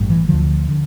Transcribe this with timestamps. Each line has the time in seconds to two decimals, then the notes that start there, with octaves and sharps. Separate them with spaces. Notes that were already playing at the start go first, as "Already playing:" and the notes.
Already playing: A1 G2
0.10 E3
0.29 D2 D3 F3
0.68 D3